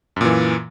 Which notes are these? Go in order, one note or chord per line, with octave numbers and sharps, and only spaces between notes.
F#2 A#2 E3